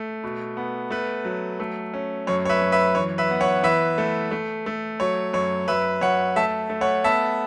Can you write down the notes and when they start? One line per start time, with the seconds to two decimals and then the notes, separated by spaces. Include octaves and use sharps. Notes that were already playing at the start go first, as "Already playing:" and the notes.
Already playing: A3
0.24 B2
0.57 B3
0.91 A3 B4
1.25 F#3
1.60 A3
1.94 C#4
2.27 F#2 C#5
2.45 C#5
2.49 B4 E5
2.61 F#2
2.72 B4 E5
2.95 E3 C#5
3.18 B4 E5
3.30 B3
3.41 C#5 F#5
3.63 E3 B4 E5
3.98 A3
4.31 A3
4.66 A3
5.00 F#3 C#5
5.33 F#2 C#5
5.68 F#2 B4 E5
6.01 F#2 C#5 F#5
6.36 A3 E5 A5
6.70 A3
6.81 C#5 F#5
7.04 B3 E5 A5